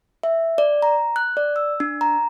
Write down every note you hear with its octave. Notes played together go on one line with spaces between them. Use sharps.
E5
D5
A#5
F#6
D5
E6
D4
A#5